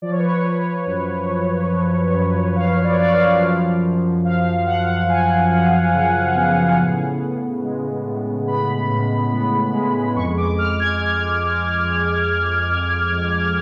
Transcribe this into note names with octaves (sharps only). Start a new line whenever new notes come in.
F3 D5
C#5
B4
C#5
F3
F#2
F3
F3
F#2
F3 F5
D5
C#5
F#2 D5
F5
F3
F#2
F3 F5
F3 F#5
F3 G#5
F3
C#3
B3
A2
A2
G#3
A2
B3 B5
A2
B3
G#3
F2 C#6
D6
F2 F6
G#6
G#3 G#6
G#3
F2
G#3
F2
F2